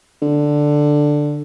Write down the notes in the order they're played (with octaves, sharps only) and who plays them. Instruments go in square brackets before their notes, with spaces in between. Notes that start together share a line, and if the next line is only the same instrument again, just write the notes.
[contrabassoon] D3